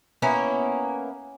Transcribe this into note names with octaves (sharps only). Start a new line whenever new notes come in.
A#3 B3 C#4 E4